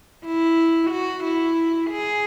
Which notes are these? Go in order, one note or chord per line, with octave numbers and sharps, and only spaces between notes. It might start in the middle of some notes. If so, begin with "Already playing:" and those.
E4
F#4
E4
G#4